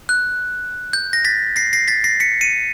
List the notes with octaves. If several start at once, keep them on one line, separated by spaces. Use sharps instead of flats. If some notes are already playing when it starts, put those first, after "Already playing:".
F#6
G6
A#6
A6 B6
A#6 C7
A#6 C7
A6 B6
A#6 C7
B6 C#7
C#7 D#7